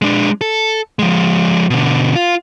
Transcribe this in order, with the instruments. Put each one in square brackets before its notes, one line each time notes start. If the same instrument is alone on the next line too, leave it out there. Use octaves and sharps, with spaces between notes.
[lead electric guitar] G#3 D4
A4
F3 G#3
B2 D3
F4